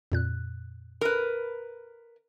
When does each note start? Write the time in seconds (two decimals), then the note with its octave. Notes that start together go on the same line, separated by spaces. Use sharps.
0.12 F2 A#2 F#6
1.01 A#4 B4